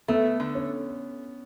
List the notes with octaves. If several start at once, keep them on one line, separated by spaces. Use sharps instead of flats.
A3 B3
D3
C#4